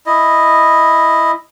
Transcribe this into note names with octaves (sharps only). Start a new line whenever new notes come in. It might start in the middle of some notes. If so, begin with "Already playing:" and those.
E4 D#5